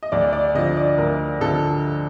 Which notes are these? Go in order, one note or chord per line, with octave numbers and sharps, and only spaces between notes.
D#5
D2 D5
D5
D3 F3 D#5
D5
D2 A#4
D3 F3 A4